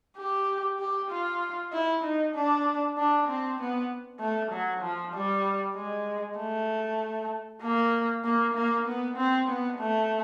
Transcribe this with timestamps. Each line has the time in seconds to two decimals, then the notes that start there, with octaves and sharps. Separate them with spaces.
0.18 G4
0.80 G4
1.11 F4
1.73 E4
2.04 D#4
2.35 D4
2.98 D4
3.28 C4
3.60 B3
4.21 A3
4.52 F#3
4.83 F3
5.14 G3
5.76 G#3
6.39 A3
7.62 A#3
8.25 A#3
8.54 A#3
8.87 B3
9.17 C4
9.48 B3
9.79 A3